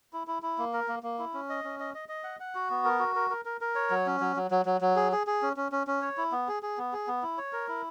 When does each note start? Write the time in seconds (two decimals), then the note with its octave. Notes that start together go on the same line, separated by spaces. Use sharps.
0.13 E4
0.27 E4
0.43 E4
0.58 A#3
0.73 A#4
0.88 A#3
1.03 A#3
1.19 E4
1.34 C#4
1.49 D#5
1.64 C#4
1.80 D#5
1.94 D#5
2.09 D#5
2.24 F#5
2.40 F#5
2.55 F#4
2.70 B3
2.85 A#4
2.99 F#4
3.16 A#4
3.30 A#4
3.45 A#4
3.61 A#4
3.75 C#5
3.90 F#3
4.06 C#4
4.20 F#3
4.36 F#3
4.51 F#3
4.66 F#3
4.81 F#3
4.96 G#4
5.12 G#4
5.27 G#4
5.42 C#4
5.57 C#4
5.72 C#4
5.87 C#4
6.02 C#5
6.17 E4
6.32 B3
6.48 G#4
6.63 G#4
6.78 B3
6.93 G#4
7.07 B3
7.23 E4
7.38 C#5
7.53 A#4
7.68 E4